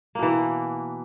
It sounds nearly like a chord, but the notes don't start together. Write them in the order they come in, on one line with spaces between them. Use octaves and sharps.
A#3 B2 E3